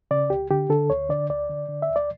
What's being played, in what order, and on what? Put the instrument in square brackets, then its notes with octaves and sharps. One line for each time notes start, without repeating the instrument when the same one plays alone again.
[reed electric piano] C#3 D5
C#2 G4
D3 G4
D3 A4
D2 C#5
D3 D5
D2 D5
D3
D3
E5
D2
D5